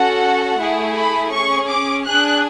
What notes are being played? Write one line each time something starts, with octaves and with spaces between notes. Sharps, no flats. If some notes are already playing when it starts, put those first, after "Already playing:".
Already playing: C#4 F#4 A4 F#5
A3 E4 G#4
B5
C#4 G#4 C#6
D6
D4 G#4 F#6